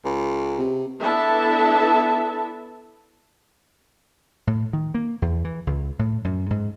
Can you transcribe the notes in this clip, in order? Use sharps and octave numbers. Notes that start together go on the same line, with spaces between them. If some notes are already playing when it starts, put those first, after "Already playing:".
C#2
C3
B3 D4 E4 A4 E5 A5
A2
D#3
A#3
E2
E3
C#2
A2
F#2
G#2